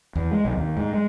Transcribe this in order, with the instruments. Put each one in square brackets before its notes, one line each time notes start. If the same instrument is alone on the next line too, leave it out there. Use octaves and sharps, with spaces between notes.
[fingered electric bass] E2
G#3
B1
D#2
G#2
G#3